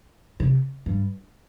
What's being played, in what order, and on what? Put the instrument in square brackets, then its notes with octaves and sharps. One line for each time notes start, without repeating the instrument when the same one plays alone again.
[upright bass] C3
G2